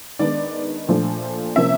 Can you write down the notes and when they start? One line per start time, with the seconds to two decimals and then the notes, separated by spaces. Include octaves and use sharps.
0.19 D#3 G#3 B3 D4 D5
0.88 A#2 F3 A3 D4
1.56 C3 F3 A#3 C#4 E5